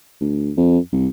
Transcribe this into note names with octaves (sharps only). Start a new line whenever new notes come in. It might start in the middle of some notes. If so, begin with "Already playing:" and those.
D2
F2
C2